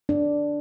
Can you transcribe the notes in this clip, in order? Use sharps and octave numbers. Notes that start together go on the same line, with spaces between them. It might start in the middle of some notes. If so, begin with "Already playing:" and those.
D4